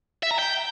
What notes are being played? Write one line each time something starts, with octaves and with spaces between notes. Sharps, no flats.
E5
A#5
G5